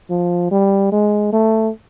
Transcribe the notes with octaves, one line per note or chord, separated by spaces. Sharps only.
F3
G3
G#3
A3